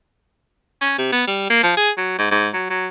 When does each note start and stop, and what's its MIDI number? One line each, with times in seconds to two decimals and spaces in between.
0.82 0.96 61
0.98 1.09 48
1.12 1.25 59
1.27 1.49 55
1.50 1.63 58
1.63 1.73 53
1.77 1.91 68
1.97 2.18 54
2.19 2.28 44
2.31 2.49 44
2.53 2.69 54
2.70 2.88 54